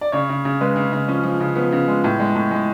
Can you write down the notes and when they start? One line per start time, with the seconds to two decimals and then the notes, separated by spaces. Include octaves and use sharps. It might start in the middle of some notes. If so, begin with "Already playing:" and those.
0.01 D5
0.12 C#3 C#5
0.29 C#3
0.45 C#3
0.61 G#3 B4
0.76 C#3
0.93 C#3
1.08 F3 C#4
1.24 F3
1.40 C#3
1.55 F3 B3
1.72 C#3
1.88 G#3
2.04 A2
2.20 G#3
2.36 A2
2.51 G#3